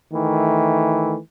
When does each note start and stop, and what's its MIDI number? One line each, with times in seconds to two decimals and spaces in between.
0.13 1.17 51
0.13 1.17 52
0.13 1.17 57